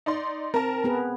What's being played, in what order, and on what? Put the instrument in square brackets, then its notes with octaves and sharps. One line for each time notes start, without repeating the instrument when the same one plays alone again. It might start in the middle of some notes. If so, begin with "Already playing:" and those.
[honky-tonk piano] D#4 D5 C6
[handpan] C4 [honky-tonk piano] A#4 A5
[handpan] B3 G#4 B4